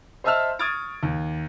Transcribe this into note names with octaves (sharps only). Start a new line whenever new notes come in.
C5 D#5 E5 A5 E6 F6
C#6 D#6 F6 G#6 A6 D7
D#2